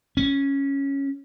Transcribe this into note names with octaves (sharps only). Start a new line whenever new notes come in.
C#4